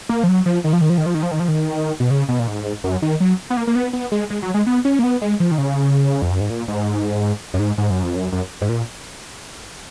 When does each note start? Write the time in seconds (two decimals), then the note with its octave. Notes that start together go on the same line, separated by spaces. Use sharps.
0.09 A#3
0.23 F3
0.28 F#3
0.46 F3
0.64 D#3
0.73 F3
0.81 D#3
0.90 F3
0.98 D#3
1.06 F3
1.14 D#3
1.23 F3
1.31 D#3
1.40 F3
1.48 D#3
2.00 B2
2.10 C#3
2.29 B2
2.39 A#2
2.47 G#2
2.84 F#2
3.02 D#3
3.20 F#3
3.50 B3
3.57 A#3
3.67 A#3
3.75 B3
3.93 B3
4.12 G#3
4.30 G#3
4.42 F#3
4.54 G#3
4.67 B3
4.85 C#4
4.99 A#3
5.04 B3
5.22 G#3
5.40 F3
5.51 D#3
5.58 C#3
6.22 F2
6.31 F#2
6.40 G#2
6.50 A#2
6.68 G#2
7.54 F#2
7.59 G#2
7.78 G#2
7.90 F#2
8.03 F2
8.16 F#2
8.32 F#2
8.61 G#2
8.69 A#2